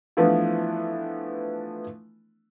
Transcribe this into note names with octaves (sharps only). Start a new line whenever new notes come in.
E3 F3 A3 B3 D4 E4